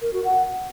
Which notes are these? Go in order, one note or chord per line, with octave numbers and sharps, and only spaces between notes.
A#4
F#4
F#5